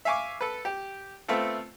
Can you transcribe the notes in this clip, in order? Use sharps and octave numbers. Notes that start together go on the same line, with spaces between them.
E5 F5 G#5 C#6 D6
A4 B4
G4
A3 B3 C4 F4 A4